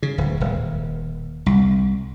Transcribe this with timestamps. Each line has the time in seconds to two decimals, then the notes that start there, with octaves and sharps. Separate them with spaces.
0.03 C#3
0.18 D1
0.41 D#1
1.46 C2